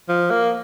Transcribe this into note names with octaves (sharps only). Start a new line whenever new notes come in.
F3
A#3